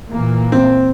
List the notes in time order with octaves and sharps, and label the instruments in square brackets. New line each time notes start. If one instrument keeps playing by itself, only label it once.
[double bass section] A#2 E3 A#3
[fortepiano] C4